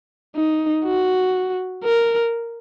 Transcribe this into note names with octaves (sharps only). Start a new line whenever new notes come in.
D#4
F#4
A#4